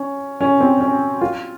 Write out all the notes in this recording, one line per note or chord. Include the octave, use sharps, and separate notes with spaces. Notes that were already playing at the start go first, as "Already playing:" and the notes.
Already playing: C#4
C#4
C4
C#4
F4